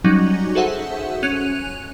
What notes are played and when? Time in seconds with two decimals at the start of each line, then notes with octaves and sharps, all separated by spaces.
0.04 F#3 G3 C#4 D#4 F#4
0.55 F#4 G#4 A4 C5 E5 F#5
1.23 C#4 F#6 D#7 F7